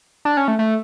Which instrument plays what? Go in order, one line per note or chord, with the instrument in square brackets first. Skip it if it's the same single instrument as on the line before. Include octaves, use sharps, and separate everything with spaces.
[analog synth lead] D4
C#4
A3
A3